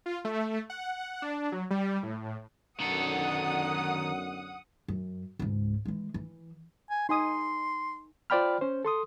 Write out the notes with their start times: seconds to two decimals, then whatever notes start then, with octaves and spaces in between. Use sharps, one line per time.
0.06 F4
0.25 A3
0.70 F#5
1.22 D4
1.52 F#3
1.71 G3
2.03 A2
2.80 B1 F#2 D3 D#3 A4 F#5 D#6
4.88 F#2
5.39 C#2 G#2
5.85 E3 G#3
6.14 E3
6.90 G#5
7.09 D#4 G#5 C6 D#6
8.30 F4 C5 D5 G5 B5 F6
8.61 C#4 C5
8.85 A4 C6 D#6